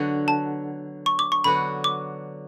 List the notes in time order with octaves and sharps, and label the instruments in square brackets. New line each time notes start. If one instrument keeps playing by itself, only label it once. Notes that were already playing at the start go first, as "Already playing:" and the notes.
Already playing: [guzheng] D3 F#3 B3 F#4
[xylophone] A5
C#6
D6
C#6
[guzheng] D3 F#3 B3 D4 F#4 [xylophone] B5
[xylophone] D6